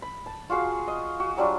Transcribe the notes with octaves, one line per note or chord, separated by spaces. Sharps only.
B5
A5
F4 F#4 G#4 F5
D#5
F#4
F#3 G3 D4 F4